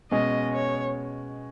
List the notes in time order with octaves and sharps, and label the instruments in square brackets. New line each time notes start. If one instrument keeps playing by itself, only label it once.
[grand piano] B2 G#3 C#4 [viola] D#5
[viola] C#5